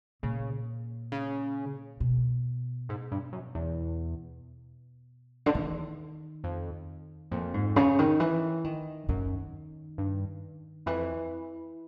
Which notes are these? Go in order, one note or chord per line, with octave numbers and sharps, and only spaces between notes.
A#2 C#3
C#3
B2
G#2
G2
F#2
E2
D3
E2 D#3
F2
F2 A#2
G#2
C#3
D#3
E3
D#3
F#2 D#3
G2
F2 E3